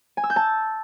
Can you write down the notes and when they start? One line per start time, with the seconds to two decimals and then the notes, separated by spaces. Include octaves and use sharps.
0.17 G#5
0.24 E6
0.30 G6
0.36 A5